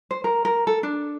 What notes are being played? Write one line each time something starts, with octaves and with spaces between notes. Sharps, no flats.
C5
A#4
A#4
A4
D4